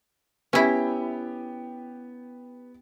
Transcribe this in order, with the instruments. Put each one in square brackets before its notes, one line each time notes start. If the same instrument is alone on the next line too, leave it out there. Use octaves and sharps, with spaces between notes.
[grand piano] B3 G4 G5 [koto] C#4 E4